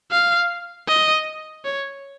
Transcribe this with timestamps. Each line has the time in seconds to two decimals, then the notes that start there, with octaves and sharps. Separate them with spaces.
0.11 F5
0.88 D#5
1.65 C#5